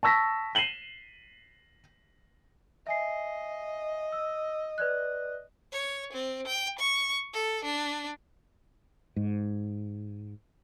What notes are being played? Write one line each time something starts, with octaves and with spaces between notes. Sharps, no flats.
A5 C#6 E6 A#6 B6
C7 D#7 E7 F#7 G7
D#5 E5 G#5 C7
E6
B4 D5 F#6
C#5
C4
G5
C#6
A4
D4
G#2